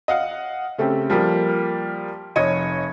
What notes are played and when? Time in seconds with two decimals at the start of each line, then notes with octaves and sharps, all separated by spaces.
0.08 D#5 F5 F#5
0.78 C#3 A3 C4 G4
1.10 F3 G3 A#3 A#4
2.36 F1 C#5 D#5 D#7